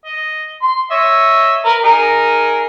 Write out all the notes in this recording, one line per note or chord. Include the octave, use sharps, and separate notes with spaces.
D#5
C6
C#5 D#5 E5
A#4 B4
D#4 G#4 A#4